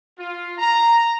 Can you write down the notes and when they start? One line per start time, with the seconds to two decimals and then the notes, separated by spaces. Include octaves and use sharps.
0.18 F4
0.58 A#5